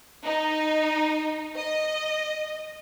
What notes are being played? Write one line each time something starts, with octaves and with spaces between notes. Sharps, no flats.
D#4
D#5